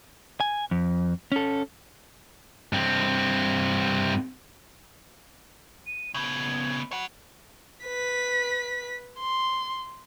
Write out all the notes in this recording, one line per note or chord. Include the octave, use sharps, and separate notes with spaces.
G#5
F2
C#4 A4
G2 C4
D#7
C#3 B3 G#6
C#5 F#5 B5
B4 B6
C6